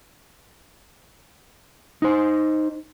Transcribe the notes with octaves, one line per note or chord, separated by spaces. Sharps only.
D#4 C5